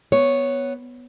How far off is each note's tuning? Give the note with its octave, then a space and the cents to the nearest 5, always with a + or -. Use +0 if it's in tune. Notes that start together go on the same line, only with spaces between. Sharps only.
B3 +0 C#5 +0